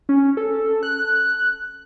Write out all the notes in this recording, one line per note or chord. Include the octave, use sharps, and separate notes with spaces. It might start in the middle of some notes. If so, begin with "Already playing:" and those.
C#4
A4
F#6